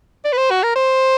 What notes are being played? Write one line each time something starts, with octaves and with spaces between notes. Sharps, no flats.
D5
B4
C5
F#4
A#4
C5